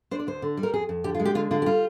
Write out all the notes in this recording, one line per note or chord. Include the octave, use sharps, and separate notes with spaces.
D4 C5
D5
D2 C5
D3
G3
A#4
F2 G#4
F2
D3 G4
F4
G#3
G4
D3 F4
D3 F4
G4
G3 F4